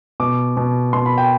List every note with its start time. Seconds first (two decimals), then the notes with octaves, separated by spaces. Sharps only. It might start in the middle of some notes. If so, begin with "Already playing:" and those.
0.20 B2 D6
0.57 B2
0.93 B2 C6
1.06 B5
1.18 G5